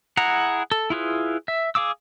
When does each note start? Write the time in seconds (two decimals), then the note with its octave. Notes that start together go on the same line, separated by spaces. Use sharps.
0.17 E4 G#4 F#5 A#5
0.72 A4
0.90 E4 F4 G#4 B4
1.48 E5
1.75 G#4 F5 D6 E6